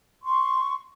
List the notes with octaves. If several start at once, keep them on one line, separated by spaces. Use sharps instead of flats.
C6 C#6